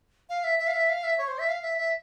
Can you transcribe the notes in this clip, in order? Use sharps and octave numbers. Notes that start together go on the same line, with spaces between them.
F5
E5
E5
F5
E5
F5
E5
C#5
C5
E5
F5
E5
E5